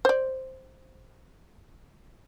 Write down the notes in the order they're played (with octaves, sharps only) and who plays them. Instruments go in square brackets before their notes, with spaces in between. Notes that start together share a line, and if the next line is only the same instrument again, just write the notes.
[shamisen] C5 D5